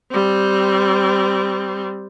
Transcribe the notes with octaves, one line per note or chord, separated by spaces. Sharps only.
G3 C4